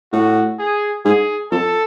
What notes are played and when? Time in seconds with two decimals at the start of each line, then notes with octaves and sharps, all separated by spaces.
0.13 A2 F#4
0.59 G#4
1.05 G#2 G#4
1.51 F2 A4